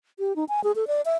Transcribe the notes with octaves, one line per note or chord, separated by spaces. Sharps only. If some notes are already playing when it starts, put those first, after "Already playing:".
G4
D#4
G#5
G#4
A4
D5
E5